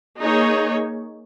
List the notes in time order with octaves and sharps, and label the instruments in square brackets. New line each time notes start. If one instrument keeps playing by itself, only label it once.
[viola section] A#3 D#4 G#4 C#5